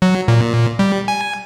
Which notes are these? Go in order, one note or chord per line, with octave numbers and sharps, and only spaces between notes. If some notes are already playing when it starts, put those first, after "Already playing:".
F#3
A#2
G3
G#5